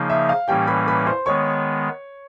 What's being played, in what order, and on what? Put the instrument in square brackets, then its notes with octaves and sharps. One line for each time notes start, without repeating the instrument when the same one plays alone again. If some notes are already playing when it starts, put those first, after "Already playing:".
Already playing: [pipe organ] C#3 F3 A#3 D#4
[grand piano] E5
F5
[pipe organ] A2 E3 G3 A#3 C#4 [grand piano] G4 G5
[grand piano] B4 B5
B4 B5
C5 C6
[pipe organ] D#3 G#3 B3 [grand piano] C#5 C#6